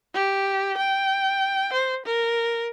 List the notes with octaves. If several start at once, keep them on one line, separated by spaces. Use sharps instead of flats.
G4
G5
C5
A#4